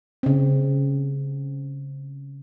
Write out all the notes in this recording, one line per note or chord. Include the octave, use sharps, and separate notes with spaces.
C#3 C4